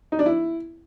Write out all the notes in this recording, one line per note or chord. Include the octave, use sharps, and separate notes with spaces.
D#4
D4
E4